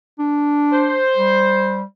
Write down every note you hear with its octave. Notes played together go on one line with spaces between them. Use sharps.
D4
C5
G3